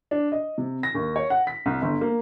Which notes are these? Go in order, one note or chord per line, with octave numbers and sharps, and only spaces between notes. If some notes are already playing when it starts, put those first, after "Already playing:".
D4
D#5
C3
A#6
D#2
C#5
F#5
B6
C2
G1
A#3